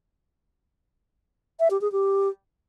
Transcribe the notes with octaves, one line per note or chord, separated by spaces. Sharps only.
E5
G4
G#4
G4